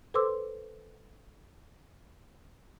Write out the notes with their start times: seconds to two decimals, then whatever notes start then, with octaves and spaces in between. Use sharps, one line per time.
0.14 A4 B4 C5 C6 D6 E6